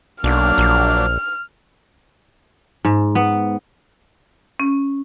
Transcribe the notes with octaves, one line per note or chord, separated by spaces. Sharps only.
B1 F#3 A#3 D4 F6
A#1
G#2
B3
C#4